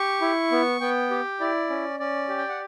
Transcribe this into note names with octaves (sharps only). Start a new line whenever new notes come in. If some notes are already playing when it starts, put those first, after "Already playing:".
Already playing: G4 C#6
E4
B3
B3 G5
G4
E4 D5
C#4
C#4 D5
G4
G5
F#5